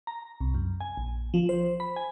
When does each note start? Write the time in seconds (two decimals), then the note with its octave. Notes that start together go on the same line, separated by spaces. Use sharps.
0.07 A#5
0.41 C2
0.54 F#2
0.81 G#5
0.97 A#1
1.34 F3
1.49 C5
1.80 B5
1.96 G#5